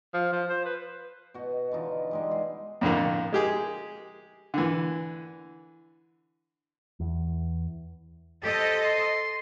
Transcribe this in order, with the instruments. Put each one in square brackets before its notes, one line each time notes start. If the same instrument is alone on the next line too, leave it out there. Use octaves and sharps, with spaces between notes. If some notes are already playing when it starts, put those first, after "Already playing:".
[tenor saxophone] F3
F3
C5
B4
[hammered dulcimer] B2 F#4 D#5
D3 E3 D#4 F4
G3 G#3 D#4
G#4
[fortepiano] F2 A2 D3 A#3
G#3 G4 G#4
D3 E3
[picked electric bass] E2
[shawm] G4 [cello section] A4 C5 D#5
[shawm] C6